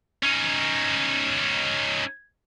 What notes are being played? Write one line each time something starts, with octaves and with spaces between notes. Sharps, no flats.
C#4 D#4